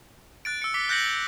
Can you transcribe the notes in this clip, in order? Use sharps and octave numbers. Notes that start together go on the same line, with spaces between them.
F#6 A6 D7
E6 C#7
D6 B6 G7
F#6 G6 A#6 C#7 F#7
A#6